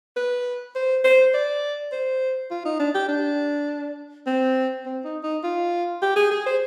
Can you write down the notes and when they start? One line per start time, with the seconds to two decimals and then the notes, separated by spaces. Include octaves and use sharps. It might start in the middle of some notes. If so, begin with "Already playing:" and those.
0.17 B4
0.76 C5
1.04 C5
1.34 D5
1.92 C5
2.51 F4
2.65 D#4
2.80 D4
2.95 G4
3.09 D4
4.27 C4
4.86 C4
5.04 D#4
5.24 D#4
5.44 F4
6.02 G4
6.16 G#4
6.31 G#4
6.46 C5